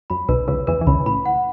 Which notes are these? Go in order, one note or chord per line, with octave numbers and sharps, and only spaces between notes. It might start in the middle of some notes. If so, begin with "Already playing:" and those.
F#2 B5
B1 B2 B4
C#2 C#3 B4
E2 E3 B4
E3
C#2 C#3 B5
A2 B5
F#5